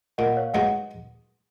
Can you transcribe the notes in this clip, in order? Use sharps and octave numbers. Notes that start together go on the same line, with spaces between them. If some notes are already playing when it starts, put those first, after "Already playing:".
A#2 D#5 F#5
C#5 F5
G#3 B3 D#4 F#4 D#5 F#5